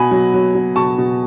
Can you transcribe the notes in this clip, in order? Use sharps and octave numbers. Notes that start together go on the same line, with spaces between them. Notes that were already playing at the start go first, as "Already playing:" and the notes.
Already playing: B2 G#5 B5
F#3
F#3
F#3
B2 A5 C#6
B2